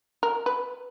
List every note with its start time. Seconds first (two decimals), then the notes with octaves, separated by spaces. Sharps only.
0.23 A#4
0.46 B4